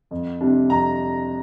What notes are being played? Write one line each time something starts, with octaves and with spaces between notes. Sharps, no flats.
F2
C3 G3 D4
F2 A#5